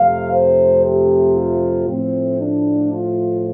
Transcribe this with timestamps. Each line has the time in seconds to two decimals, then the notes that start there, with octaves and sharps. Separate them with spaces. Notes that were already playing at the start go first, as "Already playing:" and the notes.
Already playing: F2 C3 A3 C4 F5
0.31 C5
0.84 G4
1.35 F4
1.87 A2 F3 A3 C4
2.40 D4
2.92 F4